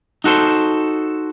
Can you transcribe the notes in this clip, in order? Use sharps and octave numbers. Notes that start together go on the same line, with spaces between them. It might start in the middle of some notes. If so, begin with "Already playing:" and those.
D#4 F#4 A4 C5